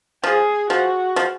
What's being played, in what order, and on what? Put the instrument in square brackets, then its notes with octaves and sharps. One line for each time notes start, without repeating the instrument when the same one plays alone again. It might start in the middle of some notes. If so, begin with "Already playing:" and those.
[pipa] F3 [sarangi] G#4
[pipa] F3 [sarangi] F#4
[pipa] F3